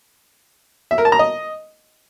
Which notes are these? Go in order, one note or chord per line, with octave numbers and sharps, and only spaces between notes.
E5
A#4
A5
A#5
D#5